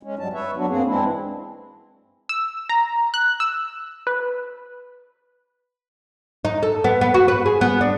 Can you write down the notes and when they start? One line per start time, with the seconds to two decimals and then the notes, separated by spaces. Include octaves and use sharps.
0.03 G#3 C#4
0.19 G2 F#3 G3 A5
0.33 B4 C#5 E5
0.57 F#3 B3 D4 F#4
0.69 G2 A#3 C4 G#4
0.86 E3 G#3 C4 D4 E4
2.29 E6
2.69 A#5
3.14 F#6
3.40 E6
4.07 B4
6.45 D#4
6.63 A4
6.84 B3
7.01 B3
7.14 F#4
7.28 B4
7.46 G#4
7.61 B3
7.81 D4